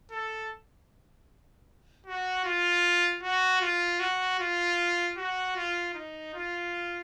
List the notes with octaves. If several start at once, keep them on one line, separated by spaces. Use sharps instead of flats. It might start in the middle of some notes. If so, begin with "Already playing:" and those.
A4
F#4
F4
F#4
F4
F#4
F4
F#4
F4
D#4
F4